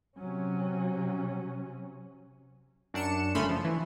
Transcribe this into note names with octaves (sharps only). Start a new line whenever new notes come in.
C3 F#3 C#4
F#2 D4 C#7 E7
G1 C#3 A3 C#4 B5 C6
F3
E3